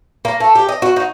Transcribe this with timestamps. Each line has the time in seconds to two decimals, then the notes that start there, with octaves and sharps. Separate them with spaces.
0.25 A#3
0.40 A3
0.55 G4
0.69 D#5
0.82 F#4
0.96 D#4